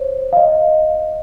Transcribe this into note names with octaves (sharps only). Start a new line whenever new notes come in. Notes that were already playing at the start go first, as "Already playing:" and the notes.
Already playing: C5 C#5
F5
D#5